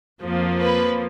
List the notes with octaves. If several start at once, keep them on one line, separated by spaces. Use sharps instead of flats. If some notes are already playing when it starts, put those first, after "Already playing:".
F2 F3 A#3
B4